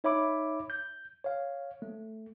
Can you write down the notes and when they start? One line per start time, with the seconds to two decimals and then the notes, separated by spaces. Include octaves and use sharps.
0.04 D#4 C#5 E5 B5 D6
0.70 G6
1.24 C#5 F5
1.82 A3